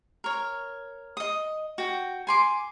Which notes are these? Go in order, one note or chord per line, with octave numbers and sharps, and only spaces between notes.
A#4 C#5
D#5 D#6
F#4 G5
G#5 C6 D6